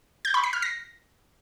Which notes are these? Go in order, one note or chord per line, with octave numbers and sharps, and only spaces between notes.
G6
B5
B6
F6
A#6